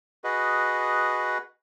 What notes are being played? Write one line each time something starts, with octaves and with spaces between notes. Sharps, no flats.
F#4 G#4 B4 D#5